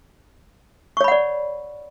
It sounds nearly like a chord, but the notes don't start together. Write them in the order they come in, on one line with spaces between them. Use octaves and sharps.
C#6 C#5 B5 F#5 D5